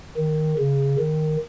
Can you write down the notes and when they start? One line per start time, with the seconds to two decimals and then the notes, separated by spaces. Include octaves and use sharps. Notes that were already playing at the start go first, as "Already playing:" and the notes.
0.17 D#3
0.59 C#3
1.00 D#3